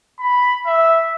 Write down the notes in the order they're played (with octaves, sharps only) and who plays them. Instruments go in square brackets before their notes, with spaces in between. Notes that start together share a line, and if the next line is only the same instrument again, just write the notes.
[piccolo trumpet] B5
E5